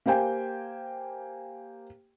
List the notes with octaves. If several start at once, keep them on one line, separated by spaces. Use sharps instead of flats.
A#3 G4 C5 G5 G#5